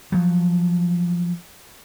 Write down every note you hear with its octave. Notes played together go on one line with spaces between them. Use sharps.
F3 F#3